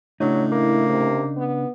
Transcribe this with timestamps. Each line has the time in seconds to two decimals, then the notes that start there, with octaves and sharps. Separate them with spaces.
0.20 A2 C#3 F#3 D4 D#4
0.52 A#3 E4
0.89 C3
1.37 B3